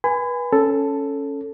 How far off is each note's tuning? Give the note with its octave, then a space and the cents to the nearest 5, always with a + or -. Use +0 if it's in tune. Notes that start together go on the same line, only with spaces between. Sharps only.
B4 -25 G#5 -10 B5 +35
C#4 +0 A4 +0